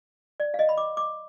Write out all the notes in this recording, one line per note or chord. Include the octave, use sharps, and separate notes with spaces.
D5
F5
D#5
B5
D6
D6